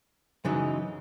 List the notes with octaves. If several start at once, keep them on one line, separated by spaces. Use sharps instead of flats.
F#2 C#3 E3 G#3 D#4